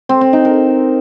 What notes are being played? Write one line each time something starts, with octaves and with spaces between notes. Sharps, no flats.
C4
C4
D#4
A#4